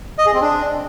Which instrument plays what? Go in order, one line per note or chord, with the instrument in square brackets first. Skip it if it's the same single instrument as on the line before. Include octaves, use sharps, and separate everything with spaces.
[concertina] D#5
G#4
C4
D4